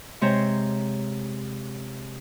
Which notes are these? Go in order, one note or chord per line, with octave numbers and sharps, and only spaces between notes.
C3 G#3 C4 C5 C#5 A#5